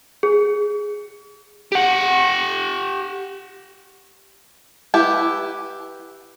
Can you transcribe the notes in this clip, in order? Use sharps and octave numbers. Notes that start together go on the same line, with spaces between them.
G#4
G4 F#5
E4 G4 B4